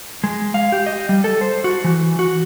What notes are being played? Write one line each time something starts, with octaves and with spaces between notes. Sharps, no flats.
G#3
F5
G4
D#5
G3
A4
C5
F#4
E3
F#4